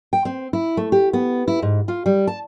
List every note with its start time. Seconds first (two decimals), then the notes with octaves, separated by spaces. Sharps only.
0.13 G5
0.25 C4
0.53 E4
0.77 A3
0.92 G4
1.13 B3
1.48 E4
1.62 G#2
1.88 F4
2.06 G3
2.27 A5